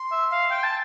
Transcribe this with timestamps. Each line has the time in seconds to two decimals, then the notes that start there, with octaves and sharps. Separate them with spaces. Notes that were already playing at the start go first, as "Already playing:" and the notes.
Already playing: C6
0.12 E5
0.32 F5
0.51 G5
0.63 A5